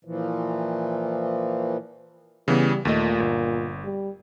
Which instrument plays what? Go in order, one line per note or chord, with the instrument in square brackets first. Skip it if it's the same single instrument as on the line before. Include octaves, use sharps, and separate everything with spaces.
[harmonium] A#2 E3 F3
[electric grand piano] C#3 E3 B3 [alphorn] G3
[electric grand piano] D#2 A3 D#5 [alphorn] A#2
[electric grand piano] G1
[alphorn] G3